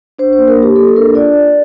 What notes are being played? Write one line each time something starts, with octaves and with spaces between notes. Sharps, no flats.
D4 C5
C5
A#3
A#4
A#3
G4
A#3 A4
A4
D4 A#4
F4 D5
F4